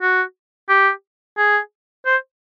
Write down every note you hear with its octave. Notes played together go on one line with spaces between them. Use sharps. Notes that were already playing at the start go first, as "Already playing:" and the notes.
F#4
G4
G#4
C5